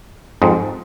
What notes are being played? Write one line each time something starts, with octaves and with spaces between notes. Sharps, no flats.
F2 G#2